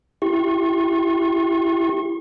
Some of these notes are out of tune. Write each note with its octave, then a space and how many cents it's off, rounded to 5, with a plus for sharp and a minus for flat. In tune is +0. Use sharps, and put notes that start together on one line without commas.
E4 +20 G4 +0 C#6 -40